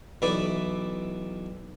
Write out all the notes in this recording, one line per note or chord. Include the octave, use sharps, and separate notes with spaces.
B1 E3 E4 B4 D5 E5